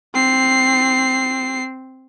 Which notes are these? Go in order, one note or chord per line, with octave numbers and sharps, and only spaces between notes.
C4 C7